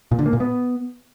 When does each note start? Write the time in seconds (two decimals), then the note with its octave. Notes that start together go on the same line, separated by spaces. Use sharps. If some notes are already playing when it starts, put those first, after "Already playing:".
0.11 A#2
0.19 D3
0.26 A#3
0.33 A#2
0.40 B3